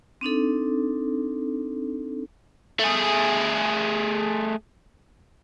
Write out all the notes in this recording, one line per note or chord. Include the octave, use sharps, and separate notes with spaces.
C4 D4 D#4 A4
A3 G#4